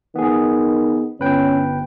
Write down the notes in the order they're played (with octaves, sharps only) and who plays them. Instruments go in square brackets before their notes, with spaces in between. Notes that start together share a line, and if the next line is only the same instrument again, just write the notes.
[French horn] D#3 [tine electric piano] B3 G#4
[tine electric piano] G1 B4 G5 [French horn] C#4